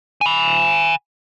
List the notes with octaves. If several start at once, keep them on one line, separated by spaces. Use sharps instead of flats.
G#5 B5